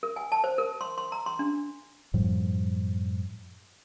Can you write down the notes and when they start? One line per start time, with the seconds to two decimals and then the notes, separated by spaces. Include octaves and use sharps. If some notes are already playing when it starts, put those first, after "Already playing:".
0.03 A#4
0.16 G#5
0.32 A5
0.44 C5
0.58 A#4
0.81 C6
0.98 C6
1.12 A#5
1.26 C6
1.39 D4
2.14 F#2 A2 F3 G3